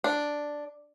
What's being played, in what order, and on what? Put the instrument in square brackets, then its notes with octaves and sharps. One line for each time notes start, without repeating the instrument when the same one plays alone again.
[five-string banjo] D4